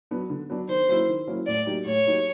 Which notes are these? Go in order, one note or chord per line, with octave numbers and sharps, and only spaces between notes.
F#3 B3 D4
D3
F#3 B3 D4
D#3 C5
F#3 A#3 C#4 E4
D#3
F#3 A#3 C#4 E4
A2 D5
F#3 A#3 D#4 G4
A2 C#5
F#3 A#3 D#4 G4